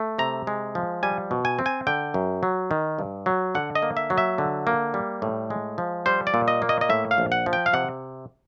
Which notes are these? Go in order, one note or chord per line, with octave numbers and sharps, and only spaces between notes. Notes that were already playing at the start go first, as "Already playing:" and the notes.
Already playing: A3
C3 A#5
G#3
F3
G3 G#5
B2
G#5
C4
G#5
D3 G5
F#2
F#3
D#3
G2
F#3
D3 F#5
D#5
A#3
E5
F#3
E5
D3
A#3
G3
A2
G#3
F3
G3 C5
D5
A#2
D#5
A#3
D#5
D#5
A2 E5
F5
A#1
F#5
F3
G5
F5
C3 F#5